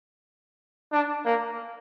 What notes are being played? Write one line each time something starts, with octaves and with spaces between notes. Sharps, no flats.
D4
A#3